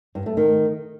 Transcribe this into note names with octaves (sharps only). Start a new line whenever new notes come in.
G2
A3
D#3